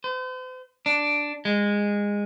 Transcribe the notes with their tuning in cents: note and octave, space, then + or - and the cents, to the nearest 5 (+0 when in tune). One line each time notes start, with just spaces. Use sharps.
C5 -45
D4 +0
G#3 -20